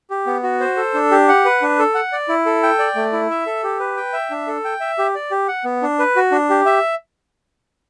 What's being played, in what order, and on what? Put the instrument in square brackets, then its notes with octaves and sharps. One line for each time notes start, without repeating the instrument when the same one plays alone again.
[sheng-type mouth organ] G4
B3
F#4
C5
A4
D4
G4
F#5
B4
D4
A4
F#5
D5
E4
A4
G5
D5
A3
E4
E5
A4
G4
B4
G5
E5
D4
A4
G5
E5
G4
D5
G4
F#5
B3
D4
B4
F#4
D4
G4
E5